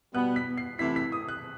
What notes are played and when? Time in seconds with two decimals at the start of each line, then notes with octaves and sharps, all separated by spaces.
0.14 B2 G3 B3 F#6
0.36 B6
0.58 C7
0.79 C3 E3 A3 E4 B6
0.96 B6
1.12 D#6
1.29 F#6